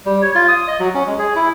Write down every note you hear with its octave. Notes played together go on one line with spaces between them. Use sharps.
G3
C#5
F4
D#6
D#5
F#3
C#4
G#3
G#4
E4